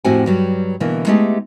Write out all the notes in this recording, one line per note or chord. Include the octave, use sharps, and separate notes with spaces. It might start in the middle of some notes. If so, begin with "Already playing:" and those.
F2 A2 C4 F#4 G4 G#5
G2 F#3 G3
B2 D3 E3 A#3
G#3 A3 B3 D#4 G4 G#4